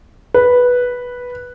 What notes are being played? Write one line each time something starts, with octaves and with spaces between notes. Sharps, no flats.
B4